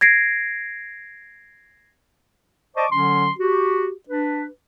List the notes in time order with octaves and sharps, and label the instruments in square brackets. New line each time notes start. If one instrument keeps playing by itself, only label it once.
[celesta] G#6 A#6 C7 D7
[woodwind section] C5 D5 D#5 A5 C#6 D6
D3 F#3 C#4 C6
F#4 G4
D4 B4